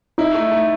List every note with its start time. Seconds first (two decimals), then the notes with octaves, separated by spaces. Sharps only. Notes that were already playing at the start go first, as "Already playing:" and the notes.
0.18 D#4 E4
0.34 A3
0.51 A3